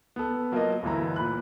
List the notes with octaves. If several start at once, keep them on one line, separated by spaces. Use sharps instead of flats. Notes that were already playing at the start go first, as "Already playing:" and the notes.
B3 A4
F#3 A#3 F4 A4 A#4 D#5
G1 D2 E3 A#5
A#2 B5 F#6